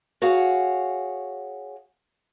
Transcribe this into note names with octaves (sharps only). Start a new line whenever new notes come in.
F#4 G#4 C#5 F5 F#5